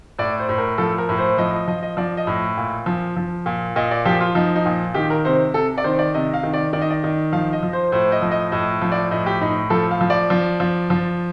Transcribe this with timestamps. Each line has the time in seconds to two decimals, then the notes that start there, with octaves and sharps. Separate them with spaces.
0.19 A2 D5
0.40 C5
0.49 A2
0.58 A#4
0.78 F3 A4
0.98 A#4
1.09 A2
1.18 C5
1.38 F3 D#5
1.53 D#5
1.67 F3 D#5
1.83 D#5
1.97 F3 D5
2.17 D#5
2.27 A2
2.57 A#2
2.86 F3
3.16 F3
3.46 A#2
3.76 A#2 D#5
3.91 D5
4.05 F3 G4
4.20 F4
4.35 F3 D#4
4.56 D#4
4.66 A#2
4.94 D#3 G4
5.10 A#4
5.25 C3 C5
5.54 C3 A4
5.78 D5
5.84 D#3 C5
5.99 D5
6.14 C3 D#5
6.34 F5
6.43 D#3
6.53 D5
6.73 D#3 D5
6.82 D#5
6.90 D5
7.04 D#3
7.33 F3 F5
7.53 D#5
7.63 F3
7.73 C5
7.92 A2 C5
8.12 D#5
8.22 F3
8.31 D#5
8.52 A2 D#5
8.82 F3
8.92 D5
9.11 A2 D#5
9.26 G4
9.41 A2 D#4
9.70 F3 A4
9.91 F5
10.01 F3
10.10 D5
10.30 F3
10.60 F3
10.90 F3